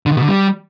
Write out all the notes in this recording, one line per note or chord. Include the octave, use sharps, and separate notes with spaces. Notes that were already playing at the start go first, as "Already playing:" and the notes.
D3
D#3
B2
D3
G3